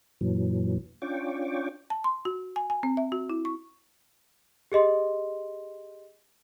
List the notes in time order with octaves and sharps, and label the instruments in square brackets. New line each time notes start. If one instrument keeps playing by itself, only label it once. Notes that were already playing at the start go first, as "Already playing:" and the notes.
[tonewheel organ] F#2 A#2 E3 F#3
C#4 D4 F4 G5 C#6 D6
[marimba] A5
C6
F#4
G#5
G#5
C4
E5
F#4
E4
C#6
[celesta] G4 G#4 D#5 C6